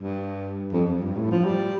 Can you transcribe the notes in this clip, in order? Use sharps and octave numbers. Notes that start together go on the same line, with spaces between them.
G2
F2
F2
G2
A2
F3
G3